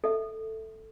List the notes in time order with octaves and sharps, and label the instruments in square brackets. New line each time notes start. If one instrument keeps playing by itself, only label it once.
[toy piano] A4 E5